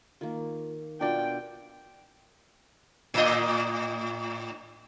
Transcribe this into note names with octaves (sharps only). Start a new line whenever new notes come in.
D#3 A#3 F4
B2 D4 F4 A#4 D5 G5
A2 D#5